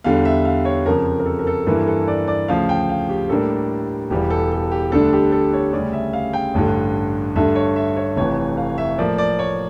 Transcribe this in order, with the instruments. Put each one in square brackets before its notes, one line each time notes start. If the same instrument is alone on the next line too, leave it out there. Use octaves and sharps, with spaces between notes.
[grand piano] E2 D3 G3 F5
E5
F5
C#5
F2 C#3 F3 A#4
A#4
A4
A#4
A4
G2 E3 A#3 E4 A4
A4
D5
D5
D2 C#3 F3 F5
G5
F5
G4
A2 G3 A#3 D4 A4
E1 E2 E3 G3 G4
A4
A4
G4
D2 D3 G3 D4 A4
G4
A4
C#5
D2 C#3 G3 C#4 D5
E5
F5
G5
A1 G2 D3
G2 D3 A3 E5
C#5
E5
C#5
F1 F2 E3 C#5
F5
E5
A2 F3 A#3 D5
D5
C#5